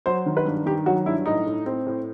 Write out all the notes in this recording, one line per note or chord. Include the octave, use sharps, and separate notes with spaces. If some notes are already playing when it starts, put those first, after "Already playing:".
F#3 C5
D#3
B4
G2
D#3 G4
F#3 F#4
G2 E4
A2 D#4
A2
C4
A2